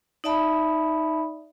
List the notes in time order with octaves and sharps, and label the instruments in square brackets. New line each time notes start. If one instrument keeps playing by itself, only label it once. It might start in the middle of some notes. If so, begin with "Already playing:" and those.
[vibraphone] D#4 D5 E5 A5 B5